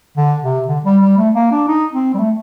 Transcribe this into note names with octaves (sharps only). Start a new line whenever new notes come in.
D3
C3
D3
G3
G3
A3
A#3
D4
D#4
C4
G3
A3